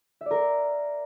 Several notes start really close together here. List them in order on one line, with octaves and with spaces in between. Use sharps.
E5 D5 A#4